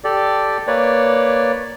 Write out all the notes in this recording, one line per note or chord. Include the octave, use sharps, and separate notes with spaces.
G4 A4 D5
A#3 B4 C#5 D5